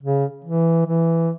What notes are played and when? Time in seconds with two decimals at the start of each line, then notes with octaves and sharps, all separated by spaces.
0.03 C#3
0.45 E3
0.86 E3